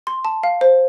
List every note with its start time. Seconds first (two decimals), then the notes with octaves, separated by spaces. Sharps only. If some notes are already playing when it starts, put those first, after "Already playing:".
0.07 C6
0.25 A5
0.43 F5
0.61 C5